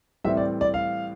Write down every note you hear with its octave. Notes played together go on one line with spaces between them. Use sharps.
A2 E3 G3 C4 E5
D5
D5
F5